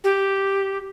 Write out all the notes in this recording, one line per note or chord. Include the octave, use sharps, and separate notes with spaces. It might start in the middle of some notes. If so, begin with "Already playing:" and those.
G4